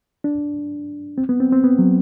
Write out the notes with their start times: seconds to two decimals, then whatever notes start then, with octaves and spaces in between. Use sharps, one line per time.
0.24 D4
1.18 C4
1.29 B3
1.40 C4
1.53 C4
1.64 B3
1.79 F#3